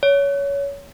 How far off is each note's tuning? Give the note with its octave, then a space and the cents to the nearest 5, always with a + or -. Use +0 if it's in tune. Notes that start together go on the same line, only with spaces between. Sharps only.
C#5 +20